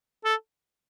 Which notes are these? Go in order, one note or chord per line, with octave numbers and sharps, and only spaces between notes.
A4